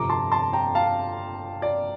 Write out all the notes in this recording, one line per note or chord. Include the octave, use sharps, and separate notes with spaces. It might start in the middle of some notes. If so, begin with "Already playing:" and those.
Already playing: G1 F2 C3 A#5 D6
A5 C6
A5 C6
G5 A#5
F5 A5
D5